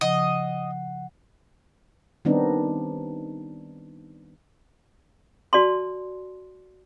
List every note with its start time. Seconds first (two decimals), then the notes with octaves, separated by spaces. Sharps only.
0.01 C#3 F3 D#5 F#5
2.25 D#3 G3 B3 C4 D4 D#4
5.53 F#4 D5 A5 C6